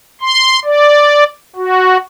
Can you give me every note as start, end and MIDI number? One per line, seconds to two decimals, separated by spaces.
0.22 0.59 84
0.65 1.24 74
1.56 1.97 66